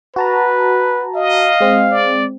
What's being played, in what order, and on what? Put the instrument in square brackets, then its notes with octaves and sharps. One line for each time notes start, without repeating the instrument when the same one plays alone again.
[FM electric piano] F#4 A5 A#5 [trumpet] B4
[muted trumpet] D#5 [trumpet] F5
[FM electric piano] G#3 C4
[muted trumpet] D5